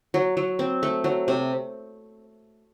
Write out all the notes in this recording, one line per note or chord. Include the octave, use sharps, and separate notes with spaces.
F#3
F#3
C4
A3
F#3
C3